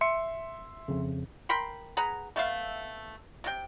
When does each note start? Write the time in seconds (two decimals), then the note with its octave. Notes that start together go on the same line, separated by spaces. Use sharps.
0.01 E5 C6 C#7
0.88 F2 C#3
1.49 A#4 G5 B5 C6
1.97 G#4 B4 F#5 A#5
2.36 A3 B3 E5 F5
3.44 C3 F4 G5